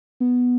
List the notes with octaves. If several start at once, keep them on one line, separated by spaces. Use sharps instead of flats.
B3